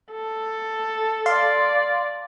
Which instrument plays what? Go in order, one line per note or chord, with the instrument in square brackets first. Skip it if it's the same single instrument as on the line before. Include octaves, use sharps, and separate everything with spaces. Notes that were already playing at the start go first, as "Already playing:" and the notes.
[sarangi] A4
[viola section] D5 [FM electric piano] F5 C6